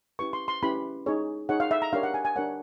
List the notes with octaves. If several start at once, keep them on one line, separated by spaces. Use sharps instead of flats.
C#4 E4 G4 B4 C#6
C6
C6
C#4 E4 G4 B4 B5
D#4 G#4 C#5
D#4 G#4 C#5 F#5
F5
E5
A#5
D4 G4 A#4 C#5 F5
F#5
G#5
G#5
D4 G4 A#4 C#5 F#5